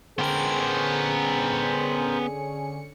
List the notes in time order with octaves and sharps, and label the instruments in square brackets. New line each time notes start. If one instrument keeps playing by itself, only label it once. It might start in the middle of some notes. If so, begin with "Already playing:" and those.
[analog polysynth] D3 C#4 C#7 [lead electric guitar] B3 G5 [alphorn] G#4 [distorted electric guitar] A#4 C5